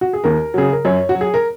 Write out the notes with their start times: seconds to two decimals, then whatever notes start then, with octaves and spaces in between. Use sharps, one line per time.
0.01 F#4
0.13 G#4
0.24 D#2 A#4
0.54 C#3 F#3 G#4
0.72 A#4
0.85 F#2 C#5
1.09 F#4
1.15 F#3
1.21 G#4
1.34 A#4